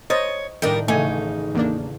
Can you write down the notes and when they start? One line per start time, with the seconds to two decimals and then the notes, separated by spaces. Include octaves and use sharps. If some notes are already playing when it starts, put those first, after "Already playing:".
0.10 C5 C#5 D#5 A6
0.62 A2 D#3 G3 D4 A#4 D#5 G5
0.88 A1 C#3 A3 D#4 G#5
1.54 E2 A#3 D4